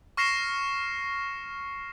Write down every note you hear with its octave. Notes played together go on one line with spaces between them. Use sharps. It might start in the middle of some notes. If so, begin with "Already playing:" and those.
C#6 F6 A#6 C7 C#7 E7